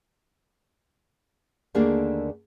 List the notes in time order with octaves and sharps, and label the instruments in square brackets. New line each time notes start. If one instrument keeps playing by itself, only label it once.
[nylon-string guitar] D#2 D3 A3 A#3 D4 G#4